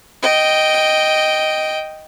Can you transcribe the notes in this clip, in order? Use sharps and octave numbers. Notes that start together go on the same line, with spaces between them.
D#5 G5